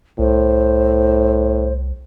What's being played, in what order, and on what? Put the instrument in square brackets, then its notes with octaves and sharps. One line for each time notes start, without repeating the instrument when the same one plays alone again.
[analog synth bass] C2 [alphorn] A2 [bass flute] C5